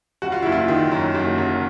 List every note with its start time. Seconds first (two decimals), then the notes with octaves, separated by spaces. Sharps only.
0.22 G3 F#4
0.32 F4
0.42 F#1 E4
0.52 F4
0.68 D#3
0.91 F#2
1.15 F#1
1.38 F#1